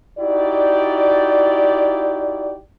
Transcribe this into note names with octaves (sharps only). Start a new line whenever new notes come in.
D#4 E4 F#4 G4 D5